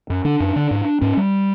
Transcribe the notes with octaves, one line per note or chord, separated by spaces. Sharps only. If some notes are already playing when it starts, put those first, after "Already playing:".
F#2
D3 D4
F#2
D3
G#2
G#2 C#4
G3